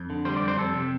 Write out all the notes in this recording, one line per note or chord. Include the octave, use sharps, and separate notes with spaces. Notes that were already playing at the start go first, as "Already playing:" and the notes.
Already playing: F2
D3
G3 C5
D5
F2
C5
F2 A4
C3